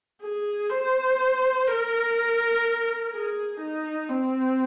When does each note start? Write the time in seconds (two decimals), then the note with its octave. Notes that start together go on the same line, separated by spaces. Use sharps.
0.22 G#4
0.70 C5
1.67 A#4
3.12 G#4
3.60 D#4
4.09 C4